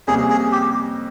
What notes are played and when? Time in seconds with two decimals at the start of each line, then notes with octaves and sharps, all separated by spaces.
0.07 F2 C3 G3 A#3 C#4 G#4
0.30 G#4
0.52 G4